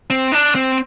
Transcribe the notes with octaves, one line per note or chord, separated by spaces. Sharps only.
C4
D4
C4